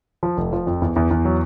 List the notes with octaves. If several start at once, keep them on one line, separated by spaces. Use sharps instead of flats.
F3
F1
F3
F2
E2
E2
E2
F#3